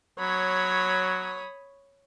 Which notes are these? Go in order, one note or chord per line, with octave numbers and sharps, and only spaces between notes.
F#3 C#5 B5 D#6